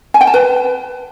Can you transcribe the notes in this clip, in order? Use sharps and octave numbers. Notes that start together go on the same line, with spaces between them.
G#5
G5
A5
B4